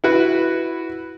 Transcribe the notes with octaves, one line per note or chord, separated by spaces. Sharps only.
E4 F#4 B4